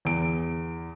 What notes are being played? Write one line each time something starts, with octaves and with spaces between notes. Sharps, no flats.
E2 D7